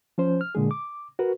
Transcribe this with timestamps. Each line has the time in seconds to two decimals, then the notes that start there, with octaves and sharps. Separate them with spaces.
0.18 F3 C#4 C5
0.41 F6
0.55 A#2 D3 G#3 G#4
0.71 D6
1.19 F#4 A#4 B4